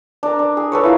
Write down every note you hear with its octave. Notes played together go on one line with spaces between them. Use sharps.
D4 A#4
D4
G#4
A4 B4 C#5
E4 F4 A#4